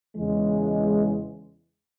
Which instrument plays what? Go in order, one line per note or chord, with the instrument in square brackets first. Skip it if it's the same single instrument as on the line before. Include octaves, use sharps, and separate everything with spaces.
[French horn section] E2 C#3 E3 G#3